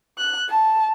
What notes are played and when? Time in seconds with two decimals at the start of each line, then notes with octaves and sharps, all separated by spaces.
0.18 F#6
0.50 A5